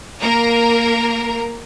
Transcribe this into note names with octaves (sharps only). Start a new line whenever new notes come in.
A#3 A#4 A#5